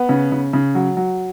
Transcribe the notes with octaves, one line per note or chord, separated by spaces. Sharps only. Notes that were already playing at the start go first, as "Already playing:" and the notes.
Already playing: B3
C#3
C#3
C#3
F#3
F#3